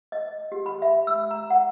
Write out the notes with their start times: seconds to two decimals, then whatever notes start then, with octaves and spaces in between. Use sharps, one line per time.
0.12 D#5
0.52 G4
0.66 B5
0.82 E5
1.07 E6
1.31 A#5
1.50 F#5